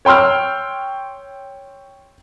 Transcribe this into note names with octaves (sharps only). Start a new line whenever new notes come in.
C#5 G5 C6 E6 F6